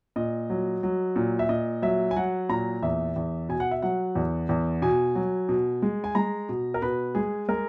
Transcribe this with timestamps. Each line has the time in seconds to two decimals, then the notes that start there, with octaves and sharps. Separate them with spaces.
0.16 A#2 D#5
0.50 F#3
0.83 F#3
1.16 A#2
1.39 E5
1.49 A#2 D#5
1.82 F#3 E5
2.11 G#5
2.16 F#3 F#5
2.49 A#2 A#5
2.82 E2 E5
3.16 E2
3.49 B2 G#5
3.60 F#5
3.71 E5
3.82 F#3 F#5
4.15 E2
4.49 E2
4.82 B2 G#5
5.15 F#3
5.49 B2
5.82 G#3
6.04 G#5
6.15 G#3 A#5
6.49 B2
6.74 A#4
6.82 B2 B4
7.15 G#3 G#4
7.48 G#3 A#4